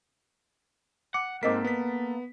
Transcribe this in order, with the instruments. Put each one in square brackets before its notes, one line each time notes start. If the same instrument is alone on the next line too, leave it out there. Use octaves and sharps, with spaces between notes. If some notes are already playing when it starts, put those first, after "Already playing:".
[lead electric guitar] F#5 [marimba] D6
[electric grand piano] G#2 C4 B6 [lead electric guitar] A#3 A4 [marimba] A#4 D#5 D6
[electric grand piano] B3 B6